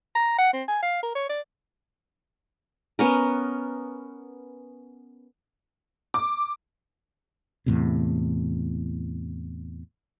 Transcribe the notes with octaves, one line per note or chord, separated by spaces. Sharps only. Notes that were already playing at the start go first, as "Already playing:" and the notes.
A#5
F#5
C4
G#5
F5
A#4
C#5
D5
B3 C#4 A#4
D6
E2 A2 C3